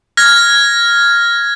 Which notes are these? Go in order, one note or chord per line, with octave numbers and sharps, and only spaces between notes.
F6 G#6 A#6